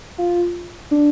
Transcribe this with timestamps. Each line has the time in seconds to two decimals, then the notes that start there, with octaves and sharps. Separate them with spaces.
0.18 F4
0.91 D4